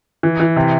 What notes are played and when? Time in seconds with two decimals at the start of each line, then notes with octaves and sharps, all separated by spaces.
0.23 E3
0.40 E3
0.56 C3